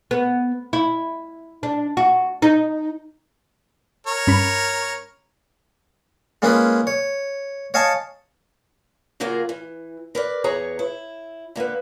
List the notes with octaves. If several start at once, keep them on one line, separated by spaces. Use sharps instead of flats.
B3
E4
D4
F#4
D#4
A#4 C#5
G2 C#4 B5
G#3 A#3 C#4 F4 G#4 B4
C#5
C#5 D#5 F5 G#5 A5 C#6
C#3 F#3 A#3 F4 G#4 A#4
E3
A#4 B4 D5
E2 G#4 B4 C#5 A#5
E4
D3 A#3 B3 B4